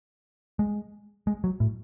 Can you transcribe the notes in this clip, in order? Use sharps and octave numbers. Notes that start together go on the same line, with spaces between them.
G#3
G#3
F#3
A2